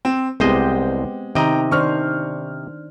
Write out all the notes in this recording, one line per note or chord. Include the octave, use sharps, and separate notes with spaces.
C4
C2 G#3 B3 C4 G4 C5 D#5
C3 D#3 D#5 G5 A#5
D#3 D4 C5 C#6 F6